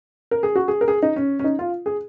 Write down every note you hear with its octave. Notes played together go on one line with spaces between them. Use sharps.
A#4
G#4
F#4
G#4
A#4
G#4
D#4
C#4
C#4
D#4
F4
G#4